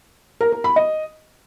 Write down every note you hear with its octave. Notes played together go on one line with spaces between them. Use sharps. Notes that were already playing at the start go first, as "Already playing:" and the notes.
A#4
A#4
B5
D#5